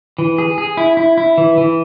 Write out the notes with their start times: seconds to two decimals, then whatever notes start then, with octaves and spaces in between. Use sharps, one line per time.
0.18 E3
0.38 G#4
0.58 G#4
0.77 E4
0.97 E4
1.18 E4
1.38 E3
1.58 E3